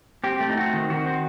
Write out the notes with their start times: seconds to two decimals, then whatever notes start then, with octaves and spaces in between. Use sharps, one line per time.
0.24 C4 G4
0.40 A3
0.49 D#4
0.57 C4 F#4
0.74 D#3
0.90 D#3 F#4
1.06 C4